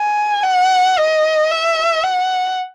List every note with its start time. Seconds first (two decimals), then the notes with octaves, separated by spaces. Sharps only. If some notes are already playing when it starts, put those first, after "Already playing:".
Already playing: G#5
0.43 F#5
0.98 D#5
1.51 E5
2.04 F#5